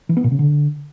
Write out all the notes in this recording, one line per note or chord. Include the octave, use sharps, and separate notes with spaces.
E3
B3
A#2
C#3
D3